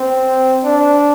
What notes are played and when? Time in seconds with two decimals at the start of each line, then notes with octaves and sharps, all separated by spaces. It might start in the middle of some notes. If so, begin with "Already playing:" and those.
Already playing: C4
0.64 D4